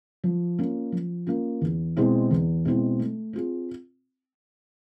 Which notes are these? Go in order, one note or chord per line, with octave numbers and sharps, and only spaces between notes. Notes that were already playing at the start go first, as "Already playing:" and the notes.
F3
A#3 C#4 F4
F3
A#3 C#4 F4
E2
B2 G#3 C4 E4
E2
B2 G#3 C4 E4
A3
C4 F4 G#4